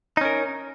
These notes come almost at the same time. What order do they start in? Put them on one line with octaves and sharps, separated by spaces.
D#4 C#4 A#4